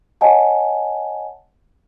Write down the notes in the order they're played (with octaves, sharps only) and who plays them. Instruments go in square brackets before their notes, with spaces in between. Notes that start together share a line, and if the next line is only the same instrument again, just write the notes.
[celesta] C#5 D#5 F#5 G#5 A5